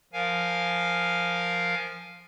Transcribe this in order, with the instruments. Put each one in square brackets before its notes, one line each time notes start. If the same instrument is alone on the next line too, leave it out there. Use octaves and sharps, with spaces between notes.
[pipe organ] F3 A#4 F5 G#5